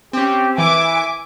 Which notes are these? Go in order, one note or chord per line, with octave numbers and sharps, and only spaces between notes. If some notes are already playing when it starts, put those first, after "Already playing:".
C4 C#4 G4
E3 E5 G#5 D6